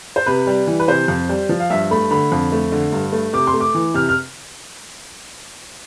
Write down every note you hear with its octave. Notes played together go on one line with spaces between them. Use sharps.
C5
C3 B4
G3
E3
B4
C3 C5
F2
G3
F3
F5
G2 E5
A3 B5
D3 B5
F2
A3
D3
G2
A3
C3 D6
C6
A3
D6
E3
C3 F6
F6